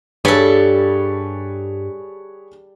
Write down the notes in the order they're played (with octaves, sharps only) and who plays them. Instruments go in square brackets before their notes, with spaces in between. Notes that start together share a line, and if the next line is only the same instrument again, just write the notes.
[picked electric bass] G2 [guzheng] G3 A4 [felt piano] G#4 B4 C#5